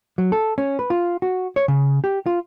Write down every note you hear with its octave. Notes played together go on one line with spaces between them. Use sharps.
F#3
A4
C#4
B4
F4
F#4
C#5
C#3
G4
F4